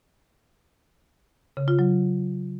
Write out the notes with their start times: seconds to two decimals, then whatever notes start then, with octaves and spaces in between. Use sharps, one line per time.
1.57 C#3
1.68 F4
1.79 F#3